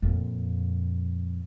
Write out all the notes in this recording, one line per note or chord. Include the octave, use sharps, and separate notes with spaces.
F2 A#2